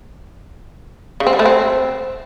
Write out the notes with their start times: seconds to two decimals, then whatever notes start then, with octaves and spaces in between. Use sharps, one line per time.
1.20 C#3
1.27 C4
1.33 G3
1.39 A3
1.46 C4